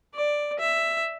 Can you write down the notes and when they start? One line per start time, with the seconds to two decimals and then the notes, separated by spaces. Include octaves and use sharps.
0.15 D5
0.59 E5